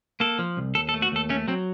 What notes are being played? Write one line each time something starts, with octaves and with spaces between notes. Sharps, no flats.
A#3 A4
F3
C2
D#2 A4
A4
A3
F#4
D#2 A4
A3 C#4
F#3 C4